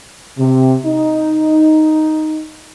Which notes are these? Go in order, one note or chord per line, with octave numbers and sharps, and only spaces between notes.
C3
D#4